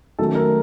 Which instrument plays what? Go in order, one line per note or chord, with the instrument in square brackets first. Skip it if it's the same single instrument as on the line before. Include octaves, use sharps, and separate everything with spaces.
[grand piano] D#3 F#3 A3 C#4 A4
A#4